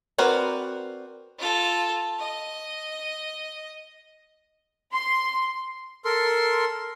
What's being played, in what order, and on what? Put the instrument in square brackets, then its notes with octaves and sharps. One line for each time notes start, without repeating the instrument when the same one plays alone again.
[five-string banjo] C4 F#4 A#4 B4 D5
[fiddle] F4 A4
D#5
[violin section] C6
[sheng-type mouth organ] A4 A#4 C6